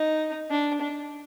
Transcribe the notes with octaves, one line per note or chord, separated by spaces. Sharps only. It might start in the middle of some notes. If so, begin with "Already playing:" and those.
Already playing: D#4
D4
D4